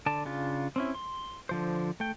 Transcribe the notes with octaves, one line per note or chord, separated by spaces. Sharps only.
D3 D5 A5
C#3 D4 F4
C4 C#4 E4
C6
D3 F3 C5
A3 G5